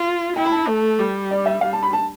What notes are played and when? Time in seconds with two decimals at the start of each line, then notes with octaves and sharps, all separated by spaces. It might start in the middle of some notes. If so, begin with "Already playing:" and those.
Already playing: F4
0.36 E4 G5
0.45 B5
0.52 A5
0.67 A3
0.99 G3
1.31 D5
1.46 E5
1.61 G3 F5
1.73 A5
1.83 B5
1.93 A5